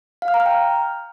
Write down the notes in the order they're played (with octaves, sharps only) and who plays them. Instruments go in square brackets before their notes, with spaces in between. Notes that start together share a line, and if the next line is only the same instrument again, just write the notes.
[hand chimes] F5
F6
A#5
F6
G5